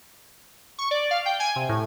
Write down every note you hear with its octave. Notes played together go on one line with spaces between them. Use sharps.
C#6
D5
F5
G5
G#5
C3
A2